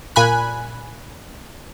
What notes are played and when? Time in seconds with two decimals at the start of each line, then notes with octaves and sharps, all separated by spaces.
0.16 A#2 G#5 B5 F#6